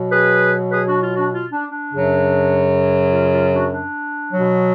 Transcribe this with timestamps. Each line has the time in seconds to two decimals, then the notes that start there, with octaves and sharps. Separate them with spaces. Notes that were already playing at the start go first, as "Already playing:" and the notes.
Already playing: B2 F#3
0.11 G#4 B4
0.71 G#4 B4
0.87 D4 F#4
1.01 F4
1.16 D4 F#4
1.32 F4
1.52 D4
1.72 D4
1.92 F#2 C#3 F#3
3.13 F4
3.33 F4
3.53 D4 F#4
3.73 D4
4.33 B2 F#3